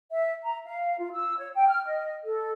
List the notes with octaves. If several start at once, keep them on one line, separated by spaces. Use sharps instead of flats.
E5
A#5
F5
F4
E6
C#5
G5
F6
D#5
A4